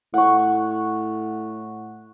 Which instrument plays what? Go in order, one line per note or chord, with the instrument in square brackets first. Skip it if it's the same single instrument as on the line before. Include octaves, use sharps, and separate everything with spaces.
[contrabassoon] A2 [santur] F#5 C#6